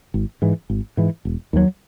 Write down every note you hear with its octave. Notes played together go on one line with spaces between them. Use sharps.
G#1
G#2 E3
G#1
G#2 E3
E1
D#2 D#3 F#3